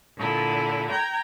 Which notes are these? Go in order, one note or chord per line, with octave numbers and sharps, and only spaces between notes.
A#2 D3 E4
G5 A#5 G#6